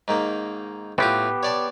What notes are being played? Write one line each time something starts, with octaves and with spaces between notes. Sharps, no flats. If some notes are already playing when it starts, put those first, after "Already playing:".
G#2 D#3 A#3
A2 B3 C4 F4 G4
C#5 D5 A5